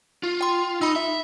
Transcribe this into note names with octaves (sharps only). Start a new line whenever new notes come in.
F4
G5 C6
D#4 B5 E6
E5